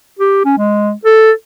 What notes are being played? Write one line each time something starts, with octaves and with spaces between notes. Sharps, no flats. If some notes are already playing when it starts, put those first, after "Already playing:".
G4
C#4
G#3
A4